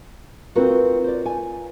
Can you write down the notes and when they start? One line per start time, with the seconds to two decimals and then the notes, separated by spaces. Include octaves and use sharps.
0.55 C4 D#4 F4 F#4 A#4 B4
1.04 C5 D5
1.26 G#5